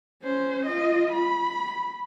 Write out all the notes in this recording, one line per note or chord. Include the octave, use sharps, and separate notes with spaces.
C#4 C5
F4 D#5
B5